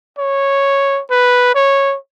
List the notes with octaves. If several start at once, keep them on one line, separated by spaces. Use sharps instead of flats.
C#5
B4
C#5